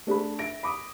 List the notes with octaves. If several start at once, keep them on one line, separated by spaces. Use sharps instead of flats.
A3 D4 G#4 B5
E5 A#6 D7
B5 D6 D#6